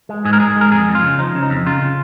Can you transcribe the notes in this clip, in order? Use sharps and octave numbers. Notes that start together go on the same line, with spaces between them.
G#3
G#2 G#4
A#4
G#2 G#4
G#3 A#4
F2 G#4
F2
F4
C#3
F3 D#4
C#3
D#4
F2
C#3 F4
C#3